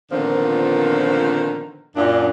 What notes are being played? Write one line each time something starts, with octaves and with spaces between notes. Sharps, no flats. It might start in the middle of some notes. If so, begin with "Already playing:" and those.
A#2 D3 D#3 F3 B3 C4
F#2 A#2 D4